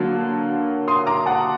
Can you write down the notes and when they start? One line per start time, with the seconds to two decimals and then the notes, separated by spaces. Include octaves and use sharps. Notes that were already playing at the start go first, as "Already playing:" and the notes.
Already playing: D3 F#3 A#3 A5
0.88 C6 D#6
1.07 A#5 D6
1.26 F#5 A5